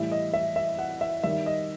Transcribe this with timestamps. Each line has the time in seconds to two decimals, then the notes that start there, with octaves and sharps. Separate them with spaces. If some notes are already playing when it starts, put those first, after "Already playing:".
Already playing: A2 E3 G3 E5
0.12 D#5
0.33 E5
0.56 E5
0.79 F#5
1.01 E5
1.24 D#3 G3 E5
1.46 D#5